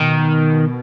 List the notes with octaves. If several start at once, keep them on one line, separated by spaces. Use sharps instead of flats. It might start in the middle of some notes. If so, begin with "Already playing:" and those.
Already playing: B2 D#3